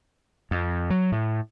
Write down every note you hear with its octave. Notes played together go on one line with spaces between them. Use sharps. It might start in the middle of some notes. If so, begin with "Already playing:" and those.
F2
F#3
A2